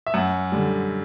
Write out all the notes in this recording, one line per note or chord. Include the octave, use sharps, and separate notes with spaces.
E5
F#2 F#5
D3 G3